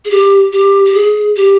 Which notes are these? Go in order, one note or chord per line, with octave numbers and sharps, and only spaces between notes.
G#4
G4
G4
G4
G#4
G4